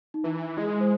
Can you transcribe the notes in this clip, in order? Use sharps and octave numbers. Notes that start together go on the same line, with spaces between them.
D#4
E3 E4
G#3 E4
C5